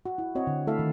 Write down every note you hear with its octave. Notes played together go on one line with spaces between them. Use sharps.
F#4
E4
C4 F#4 C#5 D#5
D3
A3 E4 A4 E5 F5
D#3